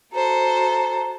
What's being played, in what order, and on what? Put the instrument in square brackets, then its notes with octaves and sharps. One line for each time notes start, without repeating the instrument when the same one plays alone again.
[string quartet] F#4 A4 C5 [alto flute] A#5